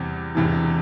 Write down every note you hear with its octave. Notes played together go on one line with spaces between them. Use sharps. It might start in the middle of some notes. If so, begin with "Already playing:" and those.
Already playing: E2 C3 G3
E1 E2 C3 E3